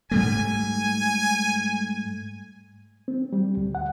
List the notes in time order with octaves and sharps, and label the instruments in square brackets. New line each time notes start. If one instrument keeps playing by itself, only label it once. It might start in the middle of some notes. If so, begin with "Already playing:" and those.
[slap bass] G#2 G3 A3 [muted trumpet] G#5
[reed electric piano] C4
G3
D2
F#5